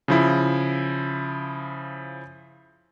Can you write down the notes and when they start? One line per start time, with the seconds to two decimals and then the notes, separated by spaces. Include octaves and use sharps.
0.08 C#3 F3 E4